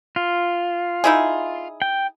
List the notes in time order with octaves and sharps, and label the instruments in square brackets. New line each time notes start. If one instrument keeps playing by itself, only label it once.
[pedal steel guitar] F4
[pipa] D#4 E4 G#4
[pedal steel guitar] G5